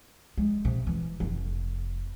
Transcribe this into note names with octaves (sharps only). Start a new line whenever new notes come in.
G#3
C3
E3
F1